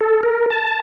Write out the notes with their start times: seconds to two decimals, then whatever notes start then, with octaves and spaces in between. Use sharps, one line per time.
0.01 A4
0.23 A#4
0.50 A5